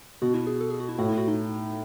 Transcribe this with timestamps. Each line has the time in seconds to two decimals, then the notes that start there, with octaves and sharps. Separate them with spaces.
0.22 B2 F#4
0.34 E4
0.47 G#4
0.61 A4
0.70 G#4
0.80 F#4
0.89 E4
0.98 A2 F#4
1.09 E4
1.18 F#4
1.28 D#4